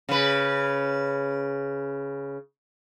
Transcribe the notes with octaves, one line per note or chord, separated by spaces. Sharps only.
C#3 B4